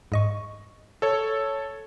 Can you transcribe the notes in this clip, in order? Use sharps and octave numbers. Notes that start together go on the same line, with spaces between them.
G#2 D#5 C#6
A4 C#5